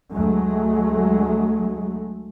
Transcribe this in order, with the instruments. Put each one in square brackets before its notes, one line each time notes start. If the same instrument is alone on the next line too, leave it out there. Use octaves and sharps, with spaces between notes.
[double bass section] D2 F#3 G#3 A3